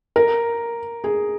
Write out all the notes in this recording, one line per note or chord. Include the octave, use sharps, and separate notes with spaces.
A#4
G#4